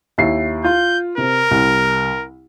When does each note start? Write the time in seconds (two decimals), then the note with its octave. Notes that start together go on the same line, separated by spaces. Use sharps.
0.18 D#2 E4 C7
0.64 F4 G6
1.18 C3 A#4
1.51 C2